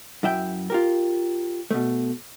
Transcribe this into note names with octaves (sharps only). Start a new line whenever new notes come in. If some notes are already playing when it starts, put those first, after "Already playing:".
F#2 E4 E5 G5
F4 G4 A#4
B2 A3